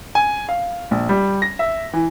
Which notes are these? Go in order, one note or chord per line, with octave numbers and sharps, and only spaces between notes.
G#5
F5
A#1
G3
A#6
E5
E3